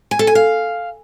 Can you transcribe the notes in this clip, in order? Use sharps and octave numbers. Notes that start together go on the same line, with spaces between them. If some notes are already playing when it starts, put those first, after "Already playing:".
G#5
A4
G#5
F5